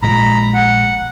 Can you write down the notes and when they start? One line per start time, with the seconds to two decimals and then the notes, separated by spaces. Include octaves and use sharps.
0.03 A#1 A#2 G#3 A#5 B5
0.54 F#5